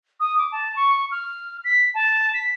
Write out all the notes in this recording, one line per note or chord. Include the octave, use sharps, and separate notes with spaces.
D#6
D6
A5
C#6
F6
B6
A5
B6